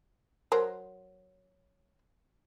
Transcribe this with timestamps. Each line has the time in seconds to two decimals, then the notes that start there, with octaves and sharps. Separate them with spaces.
0.52 F#3 A#4 C5